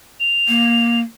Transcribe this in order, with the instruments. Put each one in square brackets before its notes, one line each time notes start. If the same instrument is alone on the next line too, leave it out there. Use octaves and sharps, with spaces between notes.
[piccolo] F7
[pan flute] A#3